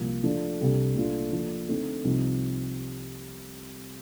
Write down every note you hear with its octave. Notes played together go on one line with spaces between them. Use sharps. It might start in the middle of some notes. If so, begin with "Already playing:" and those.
Already playing: C2 A#2 F3 A#3
F3 A3 D4
C2 C3 G3 D4 A4
C2 A#2 A3 D4 F4
F3 A#3 D4 A4
D3 A3 C4 D#4
C2 C3 F3 C4 D#4